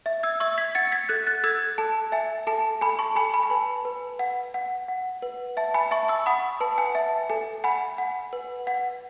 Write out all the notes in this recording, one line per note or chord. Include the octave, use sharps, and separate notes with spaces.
E5
E6 G#6
E5 C#6 E6
G#6 B6
F#5 A6 C#7
G#6 B6
A4 F#6 A6
F#6 A6
A4 E6 G#6
A4 A5
E5 G#5
A4 A5
A4 G#5 B5
A5 C#6
A4 G#5 B5
G#5 B5
A5
B4 G#5 B5
B4
F#5
F#5
F#5
B4
E5 A5
G#5 B5
E5 A5 C#6
C#6 E6
F#5 B5 D#6
B4 A5
G#5
E5 A5
A4 G#5
F#5 G#5 B5
F#5
B4
F#5